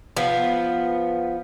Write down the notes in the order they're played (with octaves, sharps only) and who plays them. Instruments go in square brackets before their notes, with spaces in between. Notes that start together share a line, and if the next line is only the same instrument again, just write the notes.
[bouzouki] F3 B3